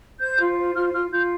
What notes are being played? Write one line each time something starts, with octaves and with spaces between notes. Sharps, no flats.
C5 G6
F4
C5
F4 F6
F4 F6
F4 G6